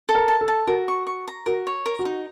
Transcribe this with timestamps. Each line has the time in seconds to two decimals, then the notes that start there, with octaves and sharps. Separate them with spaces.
0.09 A4
0.15 A#4
0.28 A5
0.41 A4
0.48 A5
0.67 F#4 A#4
0.88 C#6
1.07 C#6
1.28 A#5
1.46 F#4 A#4
1.67 C#5
1.86 A#4
1.99 F#4
2.05 D#4